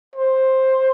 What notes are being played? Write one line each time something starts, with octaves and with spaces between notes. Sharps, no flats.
C5